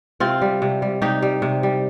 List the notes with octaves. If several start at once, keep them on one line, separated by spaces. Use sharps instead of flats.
C3 C4 F4
G3
C3
G3
C3 D#4 G4
G3
C3
G3